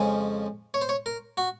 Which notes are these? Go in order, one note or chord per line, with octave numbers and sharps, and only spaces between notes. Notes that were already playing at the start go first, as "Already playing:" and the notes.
Already playing: F2 C#3 F3 G#3 C#4
C#5
C5
C#5
A#4
F#4